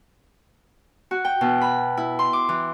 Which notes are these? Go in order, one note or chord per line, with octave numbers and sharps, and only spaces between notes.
F#4
G5
B2
B5
E4
C6
D6
E3